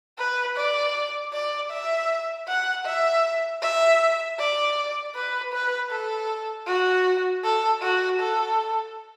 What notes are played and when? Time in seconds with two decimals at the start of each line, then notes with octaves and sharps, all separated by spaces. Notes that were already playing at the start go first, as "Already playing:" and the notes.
0.18 B4
0.57 D5
1.33 D5
1.71 E5
2.48 F#5
2.86 E5
3.62 E5
4.39 D5
5.15 B4
5.53 B4
5.91 A4
6.67 F#4
7.44 A4
7.82 F#4
8.20 A4